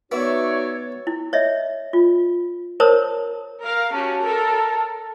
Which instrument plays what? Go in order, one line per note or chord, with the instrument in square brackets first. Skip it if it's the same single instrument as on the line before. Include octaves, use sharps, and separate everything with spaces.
[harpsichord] B3 [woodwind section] D#4 F#4 [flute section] C#5 [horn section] D5 E5
[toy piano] E4
C#5 D#5 E5
F4
A#4 C5 C#5 A5 A#5 D#6
[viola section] A#4 F5
[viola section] C#4 F#4 G4 [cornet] A5
[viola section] A4 A#4